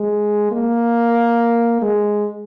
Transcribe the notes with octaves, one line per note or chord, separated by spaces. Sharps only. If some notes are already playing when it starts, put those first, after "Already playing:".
Already playing: G#3
A#3
G#3